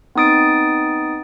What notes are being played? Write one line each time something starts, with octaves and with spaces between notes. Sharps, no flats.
B3 C4 D#4 D#6 A6 D7